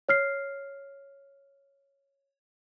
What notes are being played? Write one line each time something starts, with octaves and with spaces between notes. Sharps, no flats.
C#5 F6 C7